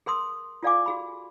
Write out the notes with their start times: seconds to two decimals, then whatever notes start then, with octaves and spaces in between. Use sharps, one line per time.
0.06 G#4 A#4 C6 D#6 E6
0.63 F4 A4 D5 F5 G#5 D6
0.86 F#4 G#4 B5